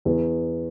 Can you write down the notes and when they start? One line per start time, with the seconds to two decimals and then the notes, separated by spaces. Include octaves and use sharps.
0.05 E2